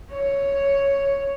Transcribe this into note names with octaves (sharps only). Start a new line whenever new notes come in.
C#5